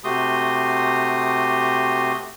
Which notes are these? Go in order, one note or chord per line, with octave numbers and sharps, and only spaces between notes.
C3 A3 F#4 G4 C6 D#6